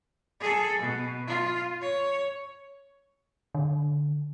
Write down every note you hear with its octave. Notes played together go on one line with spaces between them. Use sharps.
G#4 A4
B2
F4
C#5
D3